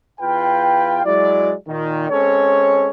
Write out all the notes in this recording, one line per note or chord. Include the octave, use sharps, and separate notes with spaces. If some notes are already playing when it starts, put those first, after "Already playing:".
E2 F4 B4 F5 G5
F#3 G#3 E4 D5
A#2 D#3
G#3 C4 C#4 A4 C#5